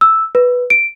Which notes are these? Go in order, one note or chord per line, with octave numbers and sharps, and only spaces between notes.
E6
B4
D7